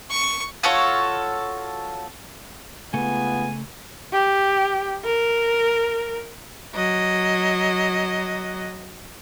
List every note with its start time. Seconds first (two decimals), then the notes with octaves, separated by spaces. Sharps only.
0.11 C#6
0.63 F4 F#4 A4 C#5
2.94 C#3 G#3 A3 B3 F4 A4 G#5
4.12 G4
5.05 A#4
6.76 F#3 D#5